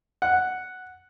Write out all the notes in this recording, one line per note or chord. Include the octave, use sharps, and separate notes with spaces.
F#5